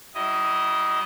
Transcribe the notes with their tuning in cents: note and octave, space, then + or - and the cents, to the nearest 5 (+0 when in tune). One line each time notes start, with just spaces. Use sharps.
G3 -45 E4 +0 D#5 +0